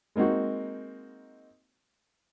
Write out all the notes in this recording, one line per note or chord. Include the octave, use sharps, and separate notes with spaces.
G#3 A#3 C4 D#4 F#4